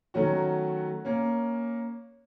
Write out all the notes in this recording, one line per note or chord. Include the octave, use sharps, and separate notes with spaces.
D#3 F#3 A3 C#4 F#4
A#3 C#4